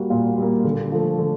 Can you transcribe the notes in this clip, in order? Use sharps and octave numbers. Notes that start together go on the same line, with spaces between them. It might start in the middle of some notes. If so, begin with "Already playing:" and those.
Already playing: G3 A#3 F#4
A#2 F4
G3 A#3
D3
F3 A3
D3